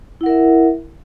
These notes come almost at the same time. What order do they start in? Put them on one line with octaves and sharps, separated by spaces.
E4 F#5 A#4 E5